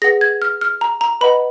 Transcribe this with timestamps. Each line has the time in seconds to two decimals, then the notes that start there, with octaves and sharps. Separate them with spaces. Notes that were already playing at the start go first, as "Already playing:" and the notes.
0.02 G#4 B4 F#5 A#6
0.21 G#6
0.42 F6
0.61 F6
0.81 A#5
1.01 A#5
1.21 B4 D#5 F#5 B5